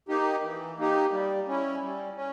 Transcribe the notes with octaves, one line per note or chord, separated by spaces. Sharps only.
A#3 D#4 G4
E3
A#3 D#4 G4
G3
C#4 E4
G3
C#4